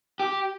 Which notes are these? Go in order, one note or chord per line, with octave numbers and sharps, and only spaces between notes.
G4